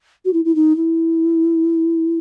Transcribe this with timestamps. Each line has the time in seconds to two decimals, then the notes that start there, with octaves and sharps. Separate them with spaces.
0.25 F#4
0.33 E4
0.45 E4
0.55 D#4
0.76 E4